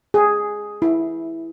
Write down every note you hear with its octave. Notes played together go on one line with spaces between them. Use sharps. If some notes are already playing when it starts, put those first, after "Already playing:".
G#4
E4